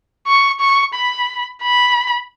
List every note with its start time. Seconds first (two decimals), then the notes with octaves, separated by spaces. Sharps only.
0.27 C#6
0.60 C#6
0.94 B5
1.62 B5